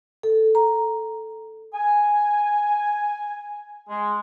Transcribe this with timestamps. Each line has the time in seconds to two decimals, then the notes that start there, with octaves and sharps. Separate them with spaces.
0.23 A4
0.55 A#5
1.74 G#5
3.89 G#3